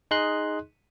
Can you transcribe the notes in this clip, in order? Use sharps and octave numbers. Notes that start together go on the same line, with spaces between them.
D#4 G#4 D#5 C6 F#6